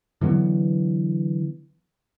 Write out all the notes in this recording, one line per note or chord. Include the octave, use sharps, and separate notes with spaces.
D3 E3 F#3 B3